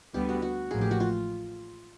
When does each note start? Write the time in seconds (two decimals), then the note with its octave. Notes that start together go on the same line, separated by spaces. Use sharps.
0.14 D2 D3 G3 B3 G4
0.29 F#4
0.42 F#4
0.71 A1 A2 F3 A#3 G#4
0.81 G4
0.91 F#4
1.00 F4